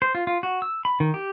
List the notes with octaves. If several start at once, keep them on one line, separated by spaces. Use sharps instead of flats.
C5
F4
F4
F#4
E6
B5
D#3
G4